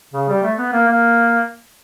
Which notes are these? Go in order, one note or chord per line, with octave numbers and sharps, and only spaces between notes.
C#3
G3
A3
B3
A#3
A#3